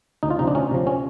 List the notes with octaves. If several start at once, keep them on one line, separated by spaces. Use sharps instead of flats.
D2 D#4
F4
C3 F3 D#4
D4
D2 C#4
C3 F3
C#4